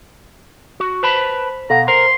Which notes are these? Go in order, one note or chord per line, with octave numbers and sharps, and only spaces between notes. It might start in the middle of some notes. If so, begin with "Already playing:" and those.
F#4
B4 C5 A5 B5 B6
B2 A4 F5 F#5 A#5
A#4 C5 C6